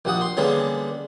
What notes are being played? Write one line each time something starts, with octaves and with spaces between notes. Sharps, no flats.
A#1 G3 F#5 D#6
C6
D3 G3 G#3 A#3 B3 C#4